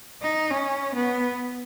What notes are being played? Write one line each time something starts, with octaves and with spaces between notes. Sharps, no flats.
D#4
C#4
B3